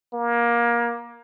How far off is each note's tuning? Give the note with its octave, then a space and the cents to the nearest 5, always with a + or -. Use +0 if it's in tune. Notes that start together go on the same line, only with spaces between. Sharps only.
A#3 +20